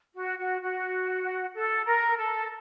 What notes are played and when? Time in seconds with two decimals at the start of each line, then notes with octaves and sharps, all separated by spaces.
0.14 F#4
0.38 F#4
0.61 F#4
1.54 A4
1.85 A#4
2.16 A4